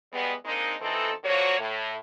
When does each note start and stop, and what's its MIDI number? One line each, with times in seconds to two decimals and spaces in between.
0.13 0.33 40
0.13 0.33 55
0.13 0.33 56
0.13 0.33 59
0.45 0.75 56
0.45 0.75 58
0.45 0.75 60
0.45 0.75 62
0.45 0.75 63
0.81 1.12 47
0.81 1.12 52
0.81 1.12 60
0.81 1.12 63
0.81 1.12 69
1.25 1.58 50
1.25 1.58 53
1.25 1.58 54
1.25 1.58 58
1.25 1.58 66
1.25 1.58 73
1.59 1.96 45